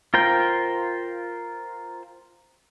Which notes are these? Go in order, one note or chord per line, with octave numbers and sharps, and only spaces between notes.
F4 A#4 C5 G5